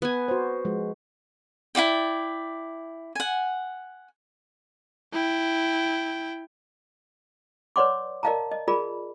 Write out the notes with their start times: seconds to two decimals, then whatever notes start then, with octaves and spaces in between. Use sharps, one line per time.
0.02 B3 G#5
0.28 F#4 C5
0.65 F3 G#3
1.75 E4 F#4 D5 G5
3.15 F#5 G#5
5.12 E4 G5
7.76 B4 C#5 D5 F#5 C6 D6
8.23 A#4 D5 D#5 F5 A5 A#5
8.51 D#5
8.68 F4 G#4 A#4 D5 B5